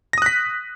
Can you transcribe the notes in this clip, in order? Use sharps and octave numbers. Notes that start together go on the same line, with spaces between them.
D#6 F#6 A#6 B6